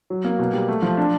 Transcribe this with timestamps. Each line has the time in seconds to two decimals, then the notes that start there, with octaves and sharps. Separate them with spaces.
0.10 F#3
0.24 A#3
0.39 B2
0.53 G3
0.68 A3
0.82 F3
0.97 D4